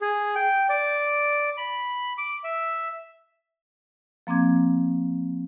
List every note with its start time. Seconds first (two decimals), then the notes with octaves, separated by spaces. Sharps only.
0.01 G#4
0.35 G5
0.69 D5
1.57 B5
2.18 D6
2.44 E5
4.27 F3 A#3 C4 D6 G#6